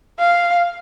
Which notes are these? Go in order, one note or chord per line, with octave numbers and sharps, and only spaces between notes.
F5